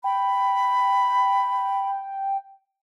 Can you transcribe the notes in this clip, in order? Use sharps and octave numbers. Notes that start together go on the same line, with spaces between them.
G5 B5